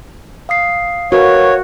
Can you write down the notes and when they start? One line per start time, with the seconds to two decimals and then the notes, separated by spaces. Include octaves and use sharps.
0.49 F5 D#6 C7
1.12 F#4 A#4 B4 C#5 F5